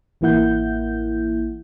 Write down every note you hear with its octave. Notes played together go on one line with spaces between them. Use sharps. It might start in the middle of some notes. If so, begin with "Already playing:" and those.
A1 E3 A#3 E4 F#5 G6